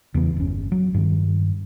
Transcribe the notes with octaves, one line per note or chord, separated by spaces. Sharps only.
E2 C#3 E3 B3
G1 C#4
F#3
G2 D#3